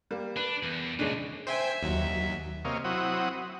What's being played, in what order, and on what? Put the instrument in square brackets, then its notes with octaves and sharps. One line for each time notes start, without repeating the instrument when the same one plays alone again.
[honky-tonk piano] G3 A#3
[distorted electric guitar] D4 [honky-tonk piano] B4
[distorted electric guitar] E2
[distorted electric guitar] C2 A#2 [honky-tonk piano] G#3 C#4 D4
[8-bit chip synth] C5 G5 G#5 [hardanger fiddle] E5
[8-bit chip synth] D#2 F#3
[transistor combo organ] C3 A#3 C#5 D#5 F5
F#3 C4 E4 F#5 D#6